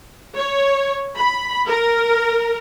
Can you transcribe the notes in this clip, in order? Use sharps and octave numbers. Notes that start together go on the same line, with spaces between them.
C#5
B5
A#4